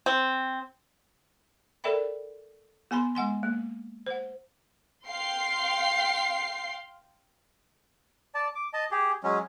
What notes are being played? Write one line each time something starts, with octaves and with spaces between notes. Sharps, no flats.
C4
A4 A#4 D5 E5 G5 B5
B3 G#5 B5 C6
G#3 F#5 G#5 C6
A#3
C5 F#5
F5 G5 C6 C7
D5 A5
D6
D#5 A5
G4 G#4
F#3 G#3 C#4